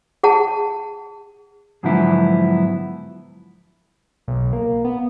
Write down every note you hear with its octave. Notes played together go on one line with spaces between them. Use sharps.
G#4 F#5 A5
G#2 D3 F3 F#3 B3 E4
B1
A#3
B3